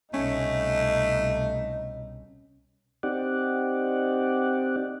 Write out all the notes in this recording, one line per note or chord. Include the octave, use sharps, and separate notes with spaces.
C2 B2 A3 C#4 D#4
C4 D#4 G4 D5 F#5